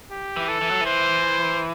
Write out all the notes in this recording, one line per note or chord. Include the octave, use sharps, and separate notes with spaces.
G4
E3
A4
E3
F#3
E3
C5